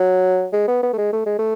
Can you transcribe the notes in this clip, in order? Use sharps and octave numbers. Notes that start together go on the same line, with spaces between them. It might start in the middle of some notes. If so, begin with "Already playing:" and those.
Already playing: F#3
G#3
B3
B3
A3
G#3
A3
G#3
A3